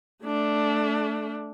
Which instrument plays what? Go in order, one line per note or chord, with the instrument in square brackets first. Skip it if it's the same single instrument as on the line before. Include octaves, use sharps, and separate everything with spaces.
[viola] A3 D4